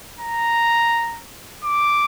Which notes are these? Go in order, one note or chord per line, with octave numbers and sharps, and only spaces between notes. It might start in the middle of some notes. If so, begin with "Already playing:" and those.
A#5
D6